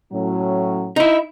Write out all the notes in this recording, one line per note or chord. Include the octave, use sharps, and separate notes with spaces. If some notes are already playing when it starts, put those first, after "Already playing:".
A2 F#3 C#4
D#4 E4